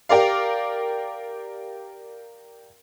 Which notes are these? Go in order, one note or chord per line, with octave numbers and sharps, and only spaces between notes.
G4 A#4 D5 F5